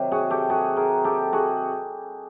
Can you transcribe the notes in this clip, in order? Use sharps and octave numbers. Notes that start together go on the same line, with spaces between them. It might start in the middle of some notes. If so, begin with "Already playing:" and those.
Already playing: C3 D#3 F#3
F#4 G#4
G4 A4
F#4 G#4
G#4 A#4
G4 A4
F#4 G#4